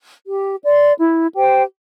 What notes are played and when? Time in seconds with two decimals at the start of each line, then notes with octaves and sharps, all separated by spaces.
0.27 G4
0.63 D5 C6
0.99 E4
1.35 G4 C5 G5